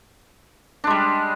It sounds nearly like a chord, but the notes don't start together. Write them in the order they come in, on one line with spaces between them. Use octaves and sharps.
D4 G#3 G3